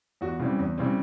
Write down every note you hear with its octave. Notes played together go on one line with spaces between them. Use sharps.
E2 F#4
C#3 E3 G3 C4
E2
C#3 E3 G3 C4